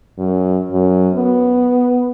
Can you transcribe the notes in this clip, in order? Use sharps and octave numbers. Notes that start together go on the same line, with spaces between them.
F#2
F#2
B3